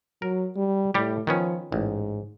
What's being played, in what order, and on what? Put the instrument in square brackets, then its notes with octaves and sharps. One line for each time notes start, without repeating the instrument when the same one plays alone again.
[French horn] F#3 [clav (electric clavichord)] A#4
[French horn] G3
[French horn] A2 [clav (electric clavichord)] G3 G4
[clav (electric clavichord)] D#3 B3 C#4 [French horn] F3
[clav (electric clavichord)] A1 [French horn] G#2